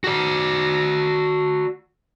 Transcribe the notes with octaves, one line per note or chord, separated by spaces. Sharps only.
F#4 D5